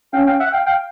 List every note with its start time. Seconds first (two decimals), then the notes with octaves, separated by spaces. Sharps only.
0.13 C#4 F5 G5
0.27 F5 G5
0.40 E5 F#5
0.52 F5 G5
0.66 F5 G5